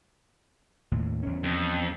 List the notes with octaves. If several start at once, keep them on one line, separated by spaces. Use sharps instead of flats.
D#2 A2
E2 C#4
F2